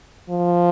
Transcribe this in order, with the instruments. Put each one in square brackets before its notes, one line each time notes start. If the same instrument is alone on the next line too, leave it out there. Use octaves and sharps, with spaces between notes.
[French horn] F3